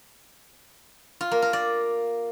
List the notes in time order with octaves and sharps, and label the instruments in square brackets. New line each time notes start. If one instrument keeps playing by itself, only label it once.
[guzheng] F4
A#3
A#4
D5